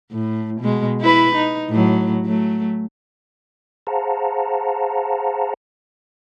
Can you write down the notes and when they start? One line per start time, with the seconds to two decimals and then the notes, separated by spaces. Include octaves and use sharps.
0.11 A2
0.60 B2 G#3
1.00 E4 B4
1.35 D#4
1.70 A2 F#3
2.26 F#3 A3
3.87 G#4 C5 F5 F#5 A5 A#5